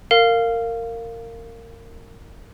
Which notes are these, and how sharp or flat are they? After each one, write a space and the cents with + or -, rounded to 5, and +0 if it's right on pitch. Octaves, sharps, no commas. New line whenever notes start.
A#4 -25 F5 +0